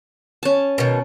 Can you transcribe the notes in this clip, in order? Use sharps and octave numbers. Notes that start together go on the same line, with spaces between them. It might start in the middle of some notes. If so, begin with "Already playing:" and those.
C#4 A5
B2 D#3